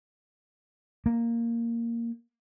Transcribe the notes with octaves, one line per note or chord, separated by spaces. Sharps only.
A#3